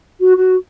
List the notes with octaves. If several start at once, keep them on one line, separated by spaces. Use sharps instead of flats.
F#4
F#4